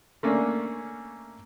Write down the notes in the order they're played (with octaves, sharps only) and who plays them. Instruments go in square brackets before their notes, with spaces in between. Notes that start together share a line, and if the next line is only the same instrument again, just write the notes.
[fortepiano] A3 A#3 C#4 D4